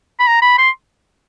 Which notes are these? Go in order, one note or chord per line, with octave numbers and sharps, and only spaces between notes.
B5
A#5
B5
C6